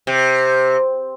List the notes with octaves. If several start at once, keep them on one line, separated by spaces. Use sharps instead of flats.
C3